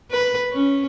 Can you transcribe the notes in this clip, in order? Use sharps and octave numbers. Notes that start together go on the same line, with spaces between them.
B4
C#4